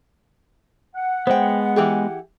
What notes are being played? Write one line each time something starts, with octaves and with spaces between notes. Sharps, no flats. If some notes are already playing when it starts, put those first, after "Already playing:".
F#5
G#3 B3 C5 G5
E3 G4 G#4